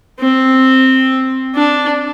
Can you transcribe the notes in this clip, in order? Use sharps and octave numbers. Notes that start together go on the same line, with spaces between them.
C4
D4